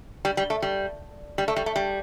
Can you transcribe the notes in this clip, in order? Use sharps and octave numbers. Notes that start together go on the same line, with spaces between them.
G3
G3
A3
G3
G3
A3
G3
A3
G3